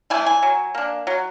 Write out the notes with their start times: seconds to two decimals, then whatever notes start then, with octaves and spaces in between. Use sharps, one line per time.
0.10 E3 G#5
0.14 A3
0.26 G#5
0.43 F#3
0.75 A#3 D4
1.07 F#3